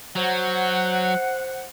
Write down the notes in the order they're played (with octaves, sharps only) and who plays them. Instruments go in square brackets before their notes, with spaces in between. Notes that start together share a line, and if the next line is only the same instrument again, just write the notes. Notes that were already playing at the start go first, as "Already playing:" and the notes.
[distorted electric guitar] F#3 [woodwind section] C5 F#5